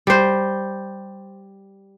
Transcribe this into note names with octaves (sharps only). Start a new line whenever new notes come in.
G3 C5